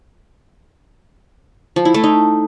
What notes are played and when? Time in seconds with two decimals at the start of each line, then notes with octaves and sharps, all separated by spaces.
1.76 F3
1.85 E4
1.94 A3
2.04 D#4